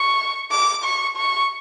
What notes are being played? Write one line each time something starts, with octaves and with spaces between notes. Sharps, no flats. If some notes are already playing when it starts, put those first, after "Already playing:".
Already playing: C#6
D6
C#6
C#6